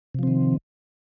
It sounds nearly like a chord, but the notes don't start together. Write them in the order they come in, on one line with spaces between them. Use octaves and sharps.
C3 F3 C4 D#3